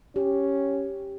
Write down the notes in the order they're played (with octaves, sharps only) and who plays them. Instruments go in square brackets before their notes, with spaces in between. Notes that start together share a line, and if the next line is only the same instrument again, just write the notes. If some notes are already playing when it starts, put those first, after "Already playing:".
[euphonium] C#4 [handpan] G4